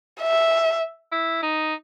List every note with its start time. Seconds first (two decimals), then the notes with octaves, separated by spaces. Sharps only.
0.21 E5
1.12 E4
1.43 D#4